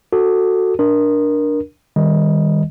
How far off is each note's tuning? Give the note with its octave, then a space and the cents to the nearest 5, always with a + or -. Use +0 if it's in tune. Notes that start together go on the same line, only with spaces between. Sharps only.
F#4 +0 A4 +15
D4 +0 A#4 +15
D#3 +0 G3 +25 D#5 +0